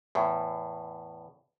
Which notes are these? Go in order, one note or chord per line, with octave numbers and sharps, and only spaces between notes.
E2 A2